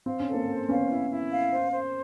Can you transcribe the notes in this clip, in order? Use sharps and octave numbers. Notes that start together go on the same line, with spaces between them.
C4 F5
C#4
A4
A#3 C4
C5
B3 C#4 F5
E4
E4
F5
C5
C5